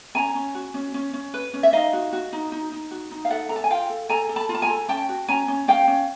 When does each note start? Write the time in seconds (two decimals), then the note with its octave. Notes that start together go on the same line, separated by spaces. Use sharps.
0.15 C#4 G#5 A#5
0.35 C#4
0.55 F#4
0.74 C#4
0.94 C#4
1.13 C#4
1.34 B4
1.54 C#4
1.63 E5
1.73 D#4 D#5 F5
1.93 F#4
2.13 F#4
2.33 D#4
2.52 D#4
2.72 D#4
2.91 F#4
3.11 D#4
3.25 F5
3.31 A4 E5 F#5
3.49 A4 A#5
3.56 A5
3.64 G#5
3.70 F4 F5 G5
3.90 A4
4.09 A4 G#5 A#5
4.29 A4
4.36 A5 B5
4.49 F4
4.54 A5
4.62 G#5 A#5
4.70 A4
4.89 C#4 G5 A5
5.09 F#4
5.28 C#4 G#5 A#5
5.48 C#4
5.68 C#4 F5 G5
5.88 C#4